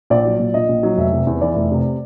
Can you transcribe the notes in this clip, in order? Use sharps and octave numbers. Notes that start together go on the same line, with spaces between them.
A#1 D5
F#3
A#2
A#1 D#5
A#1
F#3
F1 E5
C3
E2
E3 D5
F1
C3